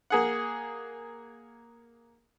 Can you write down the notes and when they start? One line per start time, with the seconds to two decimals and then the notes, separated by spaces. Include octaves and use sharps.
0.10 A#3 G#4 F#5